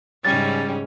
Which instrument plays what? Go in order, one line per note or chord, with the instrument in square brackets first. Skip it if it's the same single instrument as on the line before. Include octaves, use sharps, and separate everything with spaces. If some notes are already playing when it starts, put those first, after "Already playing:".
[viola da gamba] G#2 C#3 C#4 [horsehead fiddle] G3 [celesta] A6